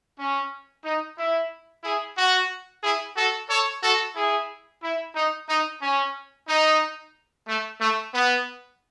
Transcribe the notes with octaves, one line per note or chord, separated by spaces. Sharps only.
C#4
D#4
E4
E4 G#4
F#4
E4 G#4
F#4 A4
A4 C#5
F#4 A4
E4 G#4
E4
D#4
D#4
C#4
D#4
A3
A3
B3